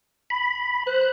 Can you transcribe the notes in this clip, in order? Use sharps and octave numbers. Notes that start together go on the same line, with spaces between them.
B5
C5 F#6